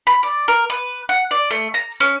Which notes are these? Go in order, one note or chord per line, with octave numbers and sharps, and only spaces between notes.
B5
D5
A#4
B4
F#5
D5
A3
A#5
C#4